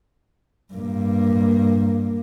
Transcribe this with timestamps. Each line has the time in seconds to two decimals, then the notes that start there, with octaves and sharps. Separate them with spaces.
0.74 G2 A#3